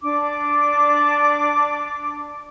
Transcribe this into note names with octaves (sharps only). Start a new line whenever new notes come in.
D4 D6